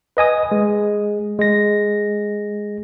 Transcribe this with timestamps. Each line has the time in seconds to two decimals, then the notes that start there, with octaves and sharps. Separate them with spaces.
0.17 B4 D#5 G#5 D#6
0.52 G#3
1.39 G#3 A#6